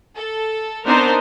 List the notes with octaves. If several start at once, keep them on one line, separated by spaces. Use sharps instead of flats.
A4
B3 C4 D4 D#4 A#4 C5